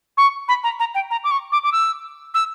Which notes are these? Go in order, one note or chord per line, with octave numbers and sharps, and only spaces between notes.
C#6
B5
A#5
A#5
G5
A#5
D6
C#6
D6
D6
E6
E6